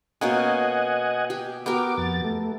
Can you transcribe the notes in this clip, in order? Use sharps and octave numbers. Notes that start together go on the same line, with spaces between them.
B2 A#3 C#4 D#5 F#5 G#5
G4
B3 F#4 G4 A#4 D6
F2 A6
A3